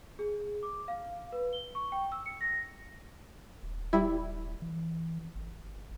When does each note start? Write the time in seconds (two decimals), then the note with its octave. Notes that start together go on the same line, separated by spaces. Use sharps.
0.19 G#4
0.63 D6
0.88 F5
1.32 B4
1.53 G7
1.75 C#6
1.92 G5
2.12 E6
2.26 C#7
2.41 A#6
3.63 D#1
3.93 G3 E4
4.62 E3
5.35 G1